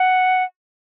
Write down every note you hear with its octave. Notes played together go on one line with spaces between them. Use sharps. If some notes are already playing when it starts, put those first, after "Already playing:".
Already playing: F#5